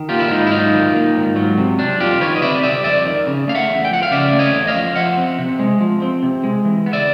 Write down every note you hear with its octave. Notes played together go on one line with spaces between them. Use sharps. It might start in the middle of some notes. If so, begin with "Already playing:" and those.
Already playing: D#3
A#3 F4 G4
E4
G#2 D#4 F4
E4
F#3 D#4 F4
D#3
A#3
G#2
F#3
C3
G3 D4
F2 F4 G4
D#3 B4 C#5
D#5
C3 D5 E5
G3 D5 E5
F2 D5 E5
D#3
C#3
A3 F5
E5 F#5
E2
G5
F3 F#5
F5
C#3 D5 E5
A3
C#5 D#5
E2
D#5 F5
F3
F3 E5 F#5
C4
C3
G#3
F3
C4
C3
G#3
E3
B3
D5 E5